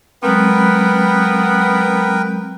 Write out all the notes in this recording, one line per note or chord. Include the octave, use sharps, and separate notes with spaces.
F#3 G#3 B3 C4 A#4 B4 G5